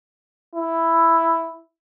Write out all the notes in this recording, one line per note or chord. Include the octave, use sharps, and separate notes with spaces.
E4